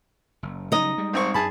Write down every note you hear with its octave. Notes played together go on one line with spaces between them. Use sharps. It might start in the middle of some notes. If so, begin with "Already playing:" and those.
F#1
C#3 F#3 G3 D#4 D#5
G3 G#3
G#1 C4 C#6
F#2 G#4 A5 B5